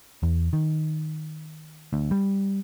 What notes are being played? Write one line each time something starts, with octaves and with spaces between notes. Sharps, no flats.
E2
D#3
D2
G3